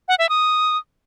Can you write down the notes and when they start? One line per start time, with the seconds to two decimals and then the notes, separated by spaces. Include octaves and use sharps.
0.08 F#5
0.19 E5
0.29 D#6